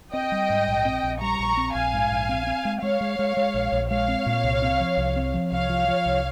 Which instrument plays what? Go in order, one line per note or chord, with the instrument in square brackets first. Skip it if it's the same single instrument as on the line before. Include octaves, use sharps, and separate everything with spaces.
[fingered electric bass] C4 [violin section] D#5 G5
[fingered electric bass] G3
G#2
A#1
C4
A#1
[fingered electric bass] G3 [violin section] A#5 C#6
[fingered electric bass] A#1
C4
[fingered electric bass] A#1 [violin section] F5 G#5
[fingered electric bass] G#2
A#1
C4
C4
G#3
[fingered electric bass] G#3 [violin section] C#5 F5
[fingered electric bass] G#3
G#3
G#3
A#1
A#1
[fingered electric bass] G#3 [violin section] C#5 F5
[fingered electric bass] C4
A#2
C2
C4
F3
C2
C4
F3
[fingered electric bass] C2 [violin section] C#5 F5
[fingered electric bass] F3
F3
C2